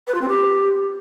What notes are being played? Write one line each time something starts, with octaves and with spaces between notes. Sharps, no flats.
B4
F4
C4
G4